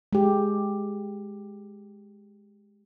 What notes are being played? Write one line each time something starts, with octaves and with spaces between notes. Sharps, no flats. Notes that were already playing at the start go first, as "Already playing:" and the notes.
G#3 G4